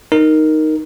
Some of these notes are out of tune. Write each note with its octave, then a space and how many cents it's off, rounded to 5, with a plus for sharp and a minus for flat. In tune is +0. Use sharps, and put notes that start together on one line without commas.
D#4 +0 A#4 +0